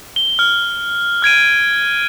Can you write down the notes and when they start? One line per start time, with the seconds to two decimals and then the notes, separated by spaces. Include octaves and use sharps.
0.16 G7
0.39 F6
1.22 F6 G#6 D7 D#7